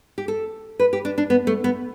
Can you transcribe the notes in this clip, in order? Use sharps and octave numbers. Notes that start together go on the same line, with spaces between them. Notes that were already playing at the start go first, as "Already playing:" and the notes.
G4
A4
B4
G4
D4
D4
B3
A3
B3